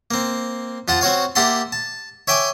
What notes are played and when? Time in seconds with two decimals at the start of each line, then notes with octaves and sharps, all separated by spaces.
0.11 A#3 C4
0.88 F2 F4 F#5 A5
1.01 C4 F#4 C#5 F5
1.35 A#3 G4 E5 F#5 A5 C6
1.72 A5
2.28 C#5 E5 G5 G#5 D6